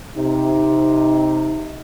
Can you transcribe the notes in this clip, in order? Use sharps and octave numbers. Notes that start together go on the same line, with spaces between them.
C3 D#4